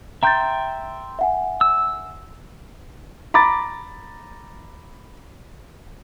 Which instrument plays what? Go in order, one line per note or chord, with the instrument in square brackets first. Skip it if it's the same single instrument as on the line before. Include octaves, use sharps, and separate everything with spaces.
[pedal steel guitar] E5 G5 C6 [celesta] A#5 G6 A6
[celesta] E5 F#5 G#5
[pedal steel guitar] E6
[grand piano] A#5 B5 D6 A6